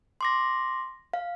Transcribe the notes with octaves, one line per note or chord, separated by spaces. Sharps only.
C6 D6 A#6
F5